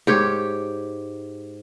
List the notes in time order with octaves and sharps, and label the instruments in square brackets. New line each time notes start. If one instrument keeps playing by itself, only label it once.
[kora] G#2 G4 C#5